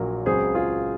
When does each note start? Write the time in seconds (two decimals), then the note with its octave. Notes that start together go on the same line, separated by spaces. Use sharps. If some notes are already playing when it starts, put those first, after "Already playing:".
Already playing: A#1 A#2 F#3 A#3
0.26 C#2 C#3 F#3 C4 G#4 C5
0.55 F4 G#4